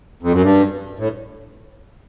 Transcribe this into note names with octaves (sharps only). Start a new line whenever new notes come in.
F2
F#2
G2
A2